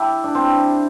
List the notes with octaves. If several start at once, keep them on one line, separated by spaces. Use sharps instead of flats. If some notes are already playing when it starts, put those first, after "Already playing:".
Already playing: E4 G4 A4
D4
C4